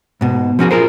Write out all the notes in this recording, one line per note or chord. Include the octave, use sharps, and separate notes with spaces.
G#2 B2
F3 C#4 F#4 G#4
F4 G#4 A#4 C5